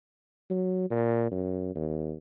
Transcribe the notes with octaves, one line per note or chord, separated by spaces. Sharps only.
F#3
A#2
F#2
D#2